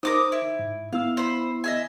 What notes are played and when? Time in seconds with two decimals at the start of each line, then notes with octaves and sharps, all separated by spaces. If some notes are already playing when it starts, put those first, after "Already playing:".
0.03 D#4 A#4 C5 D6 D#6
0.32 E4
0.59 G#2
0.93 B3 E4 F5 E6
1.17 C5 B5
1.64 D#5 E5 G#5